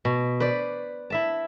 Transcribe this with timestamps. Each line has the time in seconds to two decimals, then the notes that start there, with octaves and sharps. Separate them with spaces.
0.05 B2
0.40 B4 C5 D5
1.10 E4 E5 A5